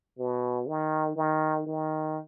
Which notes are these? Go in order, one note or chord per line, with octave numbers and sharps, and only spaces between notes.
B2
D#3
D#3
D#3